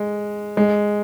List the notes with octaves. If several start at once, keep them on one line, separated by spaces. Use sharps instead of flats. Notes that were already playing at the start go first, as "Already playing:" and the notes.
Already playing: G#3
G#3